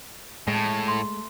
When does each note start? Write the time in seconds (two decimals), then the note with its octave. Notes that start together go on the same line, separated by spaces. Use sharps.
0.48 A2 G#3 G#5 A5
0.88 A3 C6